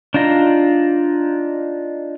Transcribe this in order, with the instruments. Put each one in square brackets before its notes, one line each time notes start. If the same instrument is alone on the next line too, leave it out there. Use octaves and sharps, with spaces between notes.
[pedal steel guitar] D4 D#4 F4 A#5